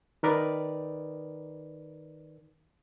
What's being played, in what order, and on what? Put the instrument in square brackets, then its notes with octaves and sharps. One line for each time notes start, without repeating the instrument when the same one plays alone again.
[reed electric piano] D#3 D#4 A#4 B4 D5